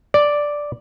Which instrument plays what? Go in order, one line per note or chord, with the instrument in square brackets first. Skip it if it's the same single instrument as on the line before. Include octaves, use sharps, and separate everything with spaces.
[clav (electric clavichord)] D5